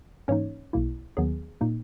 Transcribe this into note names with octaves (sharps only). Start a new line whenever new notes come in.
G#2 E3 A#3 C#4 D#4 C#5
B1 B2 A#3 E4
D#2 D#3 F#3 B3 G#4
A#2 A#3 D#4